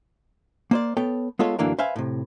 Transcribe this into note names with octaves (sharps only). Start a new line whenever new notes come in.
A#3 C5 D5
B3 A4 C#5 G5
G#3 B3 F4 A4 C#5
F#2 D3 E3 A#3 D4
B4 C5 E5 F5 G#5
A2 C3